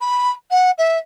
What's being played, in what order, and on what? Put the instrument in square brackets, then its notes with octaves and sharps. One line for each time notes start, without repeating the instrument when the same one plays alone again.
[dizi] B5
F#5
E5